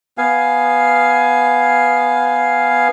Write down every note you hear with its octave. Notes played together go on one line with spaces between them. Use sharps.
B3 F5 G#5